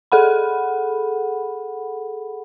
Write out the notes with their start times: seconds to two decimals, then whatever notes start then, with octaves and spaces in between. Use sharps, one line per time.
0.12 G#4 A4 F#5 B5